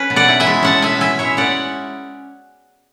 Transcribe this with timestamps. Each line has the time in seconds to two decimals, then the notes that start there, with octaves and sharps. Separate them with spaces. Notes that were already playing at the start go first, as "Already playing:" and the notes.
Already playing: C#4 B4
0.10 B2
0.16 D5 F#5
0.28 E4
0.40 E5 G#5
0.47 G#3
0.63 C#4 F#5 A5
0.82 B2 E5 G#5
1.01 E4 E5 G#5
1.19 G#3 C#5 E5
1.37 C#4 D5 F#5